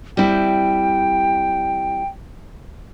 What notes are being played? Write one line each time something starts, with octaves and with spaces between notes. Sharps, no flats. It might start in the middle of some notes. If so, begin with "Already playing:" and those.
G3 C4 E4 G5